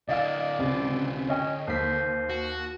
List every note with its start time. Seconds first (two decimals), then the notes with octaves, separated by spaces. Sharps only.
0.09 D3 E4 D5 D#5 F5 E6
0.59 C#2 C3
1.29 C#4 C#5 D#5 G5
1.67 D#2 C5 B6
2.30 F#4